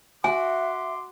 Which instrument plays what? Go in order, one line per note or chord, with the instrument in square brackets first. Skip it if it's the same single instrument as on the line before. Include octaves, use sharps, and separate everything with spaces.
[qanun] F#4 [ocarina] E5 [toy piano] G#5 [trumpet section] C6 D6